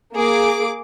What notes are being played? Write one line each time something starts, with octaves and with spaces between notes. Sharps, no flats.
A#3 G#4 D6